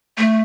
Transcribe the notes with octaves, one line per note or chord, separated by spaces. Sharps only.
A3